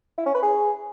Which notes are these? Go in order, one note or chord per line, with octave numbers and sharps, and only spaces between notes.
E4
C#4
B4
G#4